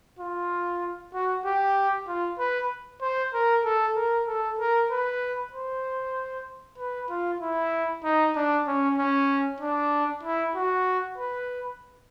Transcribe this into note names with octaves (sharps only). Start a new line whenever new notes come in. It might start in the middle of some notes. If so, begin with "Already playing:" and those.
F4
F#4
G4
F4
B4
C5
A#4
A4
A#4
A4
A#4
B4
C5
B4
F4
E4
D#4
D4
C#4
C#4
D4
E4
F#4
B4